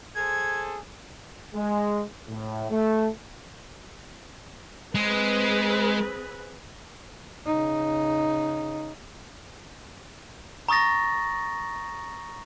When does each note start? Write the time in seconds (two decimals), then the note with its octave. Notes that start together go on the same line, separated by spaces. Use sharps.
0.15 G#4 A4 C5 G#6
1.55 G#3
2.28 A2
2.70 A3
4.95 G#3 C4 G#4 B4
7.46 C#3 D#4
10.69 A#5 C#6 D#6 A6 A#6